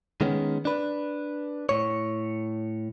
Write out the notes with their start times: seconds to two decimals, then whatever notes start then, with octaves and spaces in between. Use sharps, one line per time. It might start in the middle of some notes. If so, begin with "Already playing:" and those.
0.21 D#3 G#3 B3 C#4
0.65 D4 B4
1.69 A2 C#5